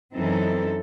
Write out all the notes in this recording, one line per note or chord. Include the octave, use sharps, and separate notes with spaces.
F#2 E3 C4 D#4 A4